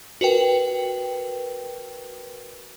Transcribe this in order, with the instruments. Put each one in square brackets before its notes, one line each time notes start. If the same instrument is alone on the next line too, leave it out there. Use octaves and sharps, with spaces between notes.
[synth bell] F#4 A#4 B4 G5